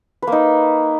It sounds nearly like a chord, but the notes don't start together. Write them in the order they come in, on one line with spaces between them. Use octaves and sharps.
B4 A#3 D#4